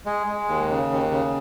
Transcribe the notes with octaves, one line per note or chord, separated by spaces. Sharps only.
G#3
G#3
D#2
C#3
D#2
C#3